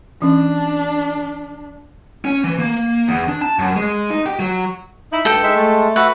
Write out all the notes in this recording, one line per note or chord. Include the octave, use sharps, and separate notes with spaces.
E3 C#4 D4
C#4
E3
A#3
E2
D4
A5
F#2
G#3
D#4
G4
F#3
D#4 E4
G2 A4 G5
G#3 D#4 D#5 E5
A3
F#4 B4 E5 F#5